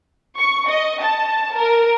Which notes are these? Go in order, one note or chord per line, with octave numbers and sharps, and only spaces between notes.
C#6
D#5
A5
A#4